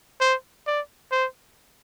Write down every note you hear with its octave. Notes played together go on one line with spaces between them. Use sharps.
C5
D5
C5